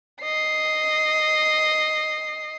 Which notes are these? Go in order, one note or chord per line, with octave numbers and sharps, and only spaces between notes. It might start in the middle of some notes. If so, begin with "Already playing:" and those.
D#5 C7